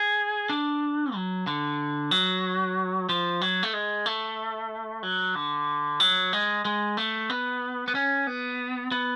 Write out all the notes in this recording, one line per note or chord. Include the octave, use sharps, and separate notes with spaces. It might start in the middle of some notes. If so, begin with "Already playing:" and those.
Already playing: G#4
D4
F#3
D3
F#3
F3
F#3
A3
G#3
A3
F#3
D3
F#3
G#3
G#3
A3
B3
B3
C#4
B3
B3